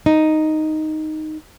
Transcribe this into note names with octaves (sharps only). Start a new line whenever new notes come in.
D#4